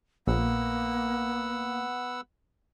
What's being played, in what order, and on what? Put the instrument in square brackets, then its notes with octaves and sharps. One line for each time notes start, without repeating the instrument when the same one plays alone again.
[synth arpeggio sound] A#1 [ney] A#3 [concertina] B3 F#5 E6